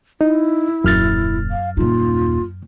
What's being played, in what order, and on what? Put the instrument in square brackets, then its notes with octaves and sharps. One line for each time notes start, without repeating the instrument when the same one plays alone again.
[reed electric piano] D#4 [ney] E4
[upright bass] D#1 [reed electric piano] F#2 F6 A6
[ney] F5
[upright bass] D#1 D#4 [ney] F4